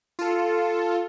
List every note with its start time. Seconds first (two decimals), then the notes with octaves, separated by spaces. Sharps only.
0.19 F4 A4